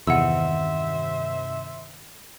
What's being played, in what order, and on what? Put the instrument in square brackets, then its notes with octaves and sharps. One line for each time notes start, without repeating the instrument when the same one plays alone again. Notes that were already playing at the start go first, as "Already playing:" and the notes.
[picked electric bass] E2 [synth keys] G2 C3 D#3 [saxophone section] C5 E5 [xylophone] F#5 E6